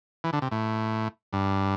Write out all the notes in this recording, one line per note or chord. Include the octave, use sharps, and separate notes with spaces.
E3
D3
C3
A2
G2